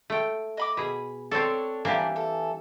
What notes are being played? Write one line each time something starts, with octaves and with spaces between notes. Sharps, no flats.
A3 G5
D#5 B5 D6
B2 G#4 B5
C4 D4 A4 C#5
E3 A#3 D4 G4 B4
A4